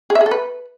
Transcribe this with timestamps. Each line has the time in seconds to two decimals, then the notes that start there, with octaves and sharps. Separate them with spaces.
0.10 G#4
0.15 E5
0.21 G#4
0.26 A4
0.31 B4